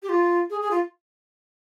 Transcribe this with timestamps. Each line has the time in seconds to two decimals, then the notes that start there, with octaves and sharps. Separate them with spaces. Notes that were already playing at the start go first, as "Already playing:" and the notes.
0.03 G4
0.09 F4
0.50 G#4
0.61 G#4
0.71 F4